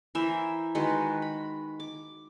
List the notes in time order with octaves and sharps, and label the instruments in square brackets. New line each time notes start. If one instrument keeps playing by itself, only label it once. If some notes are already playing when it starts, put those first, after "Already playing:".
[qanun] E3 A#4 C5 E5
D#3 G#3 F#4 B4
B5
D6